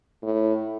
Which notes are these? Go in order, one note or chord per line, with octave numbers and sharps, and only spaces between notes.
A2